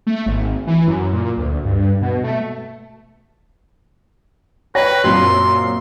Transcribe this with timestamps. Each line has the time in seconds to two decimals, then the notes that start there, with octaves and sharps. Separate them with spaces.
0.07 A3
0.26 G#1
0.67 E3
0.88 F#2
1.13 A#2
1.37 D2
1.65 G2
2.02 B2
2.24 A3
4.75 B4 C#5 G5 A#6
5.04 F#2 A#2 C4 C6